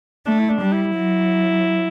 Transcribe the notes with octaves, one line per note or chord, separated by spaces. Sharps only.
A3 D4
E4
D4
G3
E4
F#3